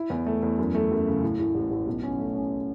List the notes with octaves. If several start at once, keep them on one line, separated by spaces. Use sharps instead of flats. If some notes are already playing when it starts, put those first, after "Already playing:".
Already playing: E4
E2
A3
E2
F#2
A3
F#2
C#3
A2
A2
A1
A1
B1
C#4
A3
C#4